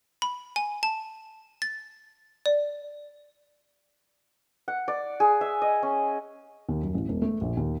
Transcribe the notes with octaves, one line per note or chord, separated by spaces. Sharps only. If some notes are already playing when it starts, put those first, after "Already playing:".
B5
G#5
A5
A6
D5
F#5
D5
G#4
E5
D#5
C#4
D#2
F#2
A1
E1
A3
A#1
D#2